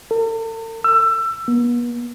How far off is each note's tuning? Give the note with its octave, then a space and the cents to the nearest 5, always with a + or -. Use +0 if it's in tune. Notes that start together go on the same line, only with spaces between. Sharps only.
A4 +45
E6 +25
B3 -40